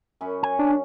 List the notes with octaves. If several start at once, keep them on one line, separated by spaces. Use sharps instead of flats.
F#2 C#4 B5
G#5
D4